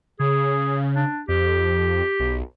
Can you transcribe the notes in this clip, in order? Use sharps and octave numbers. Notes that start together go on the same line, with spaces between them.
C#3 G#4
D4
F2 G4
B1